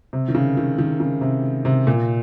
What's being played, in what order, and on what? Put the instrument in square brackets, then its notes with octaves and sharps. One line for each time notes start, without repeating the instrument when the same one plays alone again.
[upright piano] C3
D#3
C#3
D#3
D#3
C#3
C3
C3
A#2